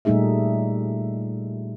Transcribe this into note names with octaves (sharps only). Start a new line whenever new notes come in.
A#2 G3 A3 D#4 G#4 E5